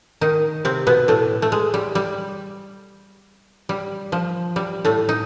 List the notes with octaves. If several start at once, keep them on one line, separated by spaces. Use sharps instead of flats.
D#3 D#4
C3 C4
B2 B3
A2 A3
A3
G#3
G3
G3
G3
F3
G3
A2 A3
D#4